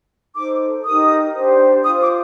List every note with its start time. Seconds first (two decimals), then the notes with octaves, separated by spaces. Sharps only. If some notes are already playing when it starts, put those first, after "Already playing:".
0.34 D#4 A4 C5 D6
0.84 D#4 G4 A#4 D#6
1.34 D4 G4 C5
1.84 F4 C5 D#6
2.01 D6